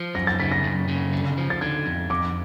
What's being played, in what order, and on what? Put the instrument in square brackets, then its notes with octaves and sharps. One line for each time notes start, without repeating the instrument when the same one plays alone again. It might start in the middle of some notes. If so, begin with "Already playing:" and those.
Already playing: [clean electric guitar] F3
[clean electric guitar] F#2 [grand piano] A#6
[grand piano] A6
[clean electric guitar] C#3 [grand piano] B6
[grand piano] A#6
[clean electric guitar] F#2
C#3
D3
F3
[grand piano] A6
[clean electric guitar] D3 [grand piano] G#6
[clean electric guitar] F2
[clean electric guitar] F2 [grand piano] D6